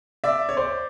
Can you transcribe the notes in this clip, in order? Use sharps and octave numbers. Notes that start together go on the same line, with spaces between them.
D5 E5
C#5
C5 D5